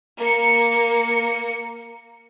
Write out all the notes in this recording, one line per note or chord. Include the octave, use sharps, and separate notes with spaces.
A#3 C#7